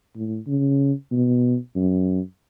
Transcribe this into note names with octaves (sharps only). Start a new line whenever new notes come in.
A2
C#3
B2
F#2